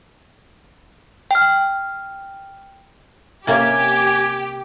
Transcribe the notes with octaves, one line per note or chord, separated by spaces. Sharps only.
G5 F6
C3 A#3 C#4 G4 G#5